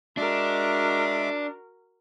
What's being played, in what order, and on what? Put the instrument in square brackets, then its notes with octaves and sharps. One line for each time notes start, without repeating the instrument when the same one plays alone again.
[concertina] G#3 E5 D6 [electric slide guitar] D4 [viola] F#4 A#4